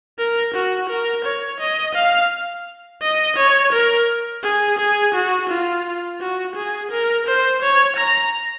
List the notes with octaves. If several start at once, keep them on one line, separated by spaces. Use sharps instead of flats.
A#4
F#4
A#4
C#5
D#5
F5
D#5
C#5
A#4
G#4
G#4
F#4
F4
F#4
G#4
A#4
C5
C#5
A#5